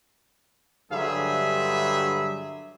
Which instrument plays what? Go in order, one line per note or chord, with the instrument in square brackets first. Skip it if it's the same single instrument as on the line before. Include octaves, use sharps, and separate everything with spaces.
[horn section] G2 D3 F#3 G3 G#4 E5